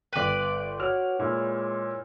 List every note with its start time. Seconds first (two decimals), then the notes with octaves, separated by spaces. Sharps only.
0.13 G1 B4 D5 G5
0.80 F#4 C#5 F6 F7
1.19 A#2 G#3 E4